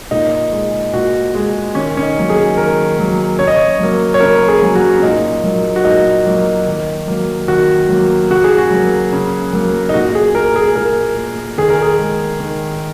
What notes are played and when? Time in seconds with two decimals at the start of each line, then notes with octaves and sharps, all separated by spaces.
0.11 A#2 D#4
0.53 G#3
0.93 A#2 F#4
1.35 G#3
1.75 D#3 C#4
1.97 C#4
2.02 D#4
2.16 F#3 A#3
2.30 G#4
2.57 D#3 A#4
2.98 F#3 A#3
3.39 C#3 C#5
3.48 D#5
3.56 C#5
3.79 F#3 A#3
4.14 C#5
4.20 C#3 A#4
4.48 G#4
4.62 F#3 A#3
4.75 F#4
4.98 C#4
5.03 A#2 D#4
5.44 F#3 A#3
5.76 F#4
5.84 A#2 D#4
6.26 F#3 A#3
6.67 D#3
7.08 F#3 A#3
7.48 D#3 F#4
7.89 F#3 A#3
8.30 C#3 F#4
8.44 G#4
8.58 F#4
8.71 F#3 A#3
9.13 C#3
9.53 F#3 A#3
9.89 D#4
9.94 A#2 F#4
10.15 G#4
10.35 A#3 A#4
10.56 G#4
10.76 A#2 A#4
11.17 A#3
11.58 D#3 G#4
11.70 A#4
11.82 G#4
11.99 G#3
12.40 D#3